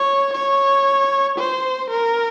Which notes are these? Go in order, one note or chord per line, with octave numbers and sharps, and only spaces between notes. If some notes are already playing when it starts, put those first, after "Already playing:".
Already playing: C#5
C#5
C5
A#4